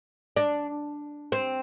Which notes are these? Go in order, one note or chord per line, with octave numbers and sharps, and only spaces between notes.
D4
C4